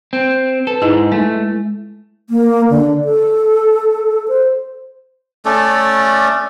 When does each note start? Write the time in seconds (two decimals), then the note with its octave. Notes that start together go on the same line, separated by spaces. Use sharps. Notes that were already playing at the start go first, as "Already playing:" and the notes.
0.13 C4
0.67 A4 B4
0.82 G#2 G#3 E4
1.12 G#3 A3
2.30 A#3
2.70 D3
3.05 A4
4.28 C5
5.45 A3 C#4 A4 D5